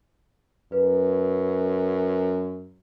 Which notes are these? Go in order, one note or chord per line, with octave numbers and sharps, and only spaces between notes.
F#2 B4